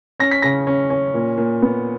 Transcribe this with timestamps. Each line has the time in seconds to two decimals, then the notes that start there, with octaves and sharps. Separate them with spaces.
0.20 C#4 A#6
0.31 B6
0.42 C#3 A#6
0.67 C#4
0.90 C#4
1.14 A#2
1.38 A#2
1.62 B3